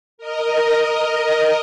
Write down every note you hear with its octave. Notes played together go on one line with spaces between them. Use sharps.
A#4 D#5